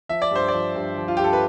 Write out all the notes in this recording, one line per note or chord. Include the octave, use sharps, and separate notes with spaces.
F3 E5
D5
G2 C5
D5
F3
G2
F3
F4
G2 G4
A4
B4